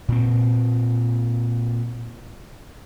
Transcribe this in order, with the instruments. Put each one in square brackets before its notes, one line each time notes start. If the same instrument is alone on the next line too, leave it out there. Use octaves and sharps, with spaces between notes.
[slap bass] A#2 C4